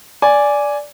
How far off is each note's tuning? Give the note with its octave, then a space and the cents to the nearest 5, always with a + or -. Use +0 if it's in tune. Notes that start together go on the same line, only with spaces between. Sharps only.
D5 -10 G#5 +0